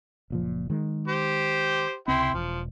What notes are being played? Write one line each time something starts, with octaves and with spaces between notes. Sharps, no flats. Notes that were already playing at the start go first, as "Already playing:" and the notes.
F#1 A#2 F3
D#3 G#3
G4 C5
C#2 C3 C4 E4 G5 C6
E1 F3